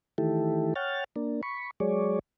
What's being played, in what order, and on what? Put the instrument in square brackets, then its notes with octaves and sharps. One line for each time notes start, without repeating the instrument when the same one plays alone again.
[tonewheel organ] D#3 E3 A3 E4 G4 A4
C#5 F#5 G5 F6 A6
A#3 D4
B5 C#6
F#3 G#3 G#4 C#5 D5